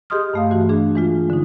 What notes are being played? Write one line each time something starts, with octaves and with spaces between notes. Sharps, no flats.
G4 G#4 D#5 C6 D#6 F6
G2 A3 F5
E3 F#4
D4 G#4
E3 G#3 F4
D3 D#4